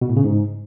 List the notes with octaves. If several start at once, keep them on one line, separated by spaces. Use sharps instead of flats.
B2
A2
C#3
G#2